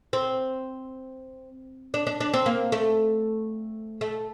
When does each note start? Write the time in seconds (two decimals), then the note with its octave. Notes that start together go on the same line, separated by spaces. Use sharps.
0.13 C4
1.94 D4
2.07 D4
2.20 D4
2.34 C4
2.46 A#3
2.72 A3
4.01 A3